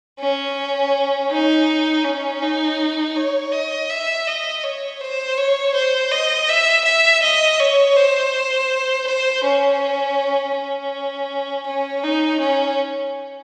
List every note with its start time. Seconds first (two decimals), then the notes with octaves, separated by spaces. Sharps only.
0.20 C#4
1.31 D#4
2.05 C#4
2.42 D#4
3.16 C#5
3.53 D#5
3.90 E5
4.27 D#5
4.64 C#5
5.01 C5
5.38 C#5
5.75 C5
6.11 D#5
6.49 E5
6.85 E5
7.23 D#5
7.60 C#5
7.96 C5
9.07 C5
9.44 C#4
10.55 C#4
11.67 C#4
12.03 D#4
12.41 C#4